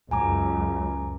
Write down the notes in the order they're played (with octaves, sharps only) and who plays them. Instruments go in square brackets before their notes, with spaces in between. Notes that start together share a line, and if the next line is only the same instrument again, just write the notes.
[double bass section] C#2 F#2 [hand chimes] G#5 A#5 D6